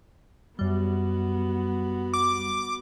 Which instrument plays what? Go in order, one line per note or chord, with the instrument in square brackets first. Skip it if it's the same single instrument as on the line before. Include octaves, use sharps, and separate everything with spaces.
[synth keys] F#2 G3 [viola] B3 F#4
[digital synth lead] D6